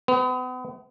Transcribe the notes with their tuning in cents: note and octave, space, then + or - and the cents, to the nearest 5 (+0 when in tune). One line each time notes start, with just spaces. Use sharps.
B3 +40